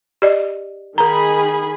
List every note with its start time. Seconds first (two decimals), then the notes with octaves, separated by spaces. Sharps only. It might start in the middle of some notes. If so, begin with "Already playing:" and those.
0.22 G4 D5 D#5
0.98 D#3 G#4 A#4 A#5 B5